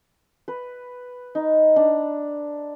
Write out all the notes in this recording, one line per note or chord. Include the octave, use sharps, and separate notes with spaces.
B4
D#4
D4